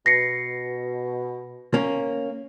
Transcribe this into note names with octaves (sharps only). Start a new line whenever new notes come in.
B2 A#6 C7 C#7
A#3 C#4